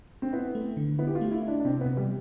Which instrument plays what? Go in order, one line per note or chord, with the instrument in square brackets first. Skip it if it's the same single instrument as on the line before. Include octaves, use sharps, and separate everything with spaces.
[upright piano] C4
[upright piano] B3 [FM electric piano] E4
[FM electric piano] A3
D3
[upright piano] B3 [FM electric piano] E4
[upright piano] G4
F4
[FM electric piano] A3
[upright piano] E4
[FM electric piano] E4
[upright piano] D4
D4
[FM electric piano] C3 [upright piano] C4
[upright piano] B3
[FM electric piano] C3
[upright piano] G3